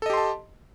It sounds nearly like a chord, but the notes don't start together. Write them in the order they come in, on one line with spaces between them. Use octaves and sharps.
A4 D#5 G4 C6 A5